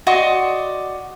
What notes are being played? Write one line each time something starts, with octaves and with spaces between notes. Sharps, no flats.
F#4 D5 D#5 C6